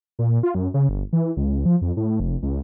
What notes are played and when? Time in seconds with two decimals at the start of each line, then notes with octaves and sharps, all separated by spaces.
0.19 A#2
0.43 F4
0.55 F#2
0.74 C#3
0.89 G1
1.13 E3
1.37 C#2
1.66 F3
1.82 F2
1.97 A2
2.20 F1
2.43 C#2